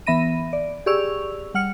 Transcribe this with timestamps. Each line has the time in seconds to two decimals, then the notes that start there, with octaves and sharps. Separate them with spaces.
0.07 E3 B3 E5 B5 A#6 D#7
0.53 D5
0.86 G4 G#4 D5 C#6 E6 F7
1.54 G3 F#5 F6 C#7